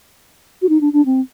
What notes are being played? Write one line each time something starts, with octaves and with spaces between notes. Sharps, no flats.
F#4
D#4
D4
D4
C4